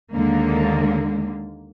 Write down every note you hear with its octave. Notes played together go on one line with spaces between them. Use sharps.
D#2 D3 G#3 A#3